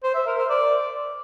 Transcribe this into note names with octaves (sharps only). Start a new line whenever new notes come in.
C5
E5
A#4
C5
D5